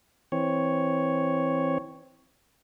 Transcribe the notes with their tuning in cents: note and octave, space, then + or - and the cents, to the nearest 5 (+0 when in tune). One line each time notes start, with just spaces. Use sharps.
E3 -5 C4 +5 C#5 +0